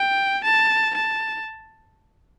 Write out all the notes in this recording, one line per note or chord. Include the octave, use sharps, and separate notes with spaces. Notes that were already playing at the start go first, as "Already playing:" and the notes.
Already playing: G5
A5
A5